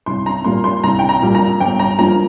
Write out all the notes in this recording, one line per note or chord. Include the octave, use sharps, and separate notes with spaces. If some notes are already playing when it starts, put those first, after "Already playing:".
C2 C6
A#5
A#2 G3 A#3 C6
C6
C2 A#5
G5
A#5
A#2 G3 A#3
A#5
G1 G5
A#5
G2 F3 A#3 A#5